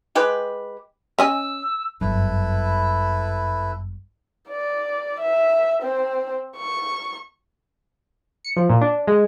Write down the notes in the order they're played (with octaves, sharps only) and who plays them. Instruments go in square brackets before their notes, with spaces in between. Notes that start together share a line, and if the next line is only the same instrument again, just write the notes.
[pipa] G#3 G4 B4
[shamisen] C#4 D#5 G#5 [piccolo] E6
[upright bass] G1 F#2 [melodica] E4 A4 B4
[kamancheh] D5
E5
C4
C#6
[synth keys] C#7
F3
A#2
D4
G#3